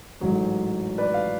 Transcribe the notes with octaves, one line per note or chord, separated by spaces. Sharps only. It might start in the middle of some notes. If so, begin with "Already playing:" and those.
A1 G#2 F#3 A3
B4 D5
F5